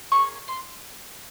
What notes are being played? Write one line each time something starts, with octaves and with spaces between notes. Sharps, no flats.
A#3 C#4 G#4 C#6
C6